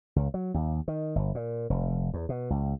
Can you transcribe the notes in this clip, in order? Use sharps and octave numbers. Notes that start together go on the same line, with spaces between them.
C#2
F#3
D#2
D#3
G1
A#2
F1
E2
B2
C#2